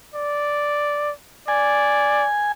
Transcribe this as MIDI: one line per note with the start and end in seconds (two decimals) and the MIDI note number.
0.15 1.12 74
1.48 2.27 74
1.48 2.52 80